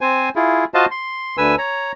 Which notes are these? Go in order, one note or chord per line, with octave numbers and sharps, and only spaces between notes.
C4 C5 G#5
E4 F4 G#4
F4 F#4 C5 D#5 F5 A5
C6
D2 D3 B4 G#5 E6
C#5 A#5